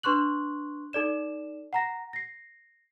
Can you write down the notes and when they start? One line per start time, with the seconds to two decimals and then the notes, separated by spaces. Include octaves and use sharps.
0.03 D4 B4 C6 C#6 F#6 F#7
0.93 D#4 A4 D5 E7
1.73 F#5 A#5 A#6
2.13 A#6 C7